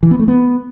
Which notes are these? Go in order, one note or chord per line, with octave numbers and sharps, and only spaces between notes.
E3
B3
A3
B3